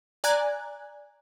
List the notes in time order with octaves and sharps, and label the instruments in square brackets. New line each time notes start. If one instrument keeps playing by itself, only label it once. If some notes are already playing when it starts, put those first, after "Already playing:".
[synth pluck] D5 G#5 A#5 F#6 G#6